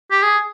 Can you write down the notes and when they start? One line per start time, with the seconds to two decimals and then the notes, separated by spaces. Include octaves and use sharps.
0.11 G4
0.22 G#4